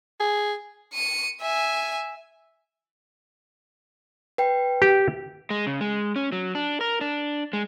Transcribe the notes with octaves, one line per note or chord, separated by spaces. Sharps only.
G#4
C#7 D#7
E5 G#5
B4 G5
G4
G#3
C#3
G#3
C#4
F#3
D4
A#4
D4
G#3